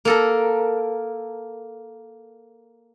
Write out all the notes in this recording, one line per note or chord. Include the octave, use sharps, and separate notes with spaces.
A#3 A4 A#4